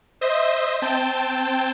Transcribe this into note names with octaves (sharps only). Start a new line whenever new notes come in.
C5 D#5 E5
C4 G5 A5 G6